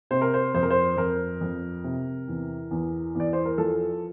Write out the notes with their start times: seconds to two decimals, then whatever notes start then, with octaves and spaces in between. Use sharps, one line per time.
0.11 C3 C5
0.21 A#4
0.34 C5
0.55 F2 C5
0.62 A#4
0.70 C5
0.97 F2 A#4
1.41 F2
1.84 C3
2.28 E2
2.71 E2
3.15 E2 D5
3.33 C5
3.45 A#4
3.58 F3 A4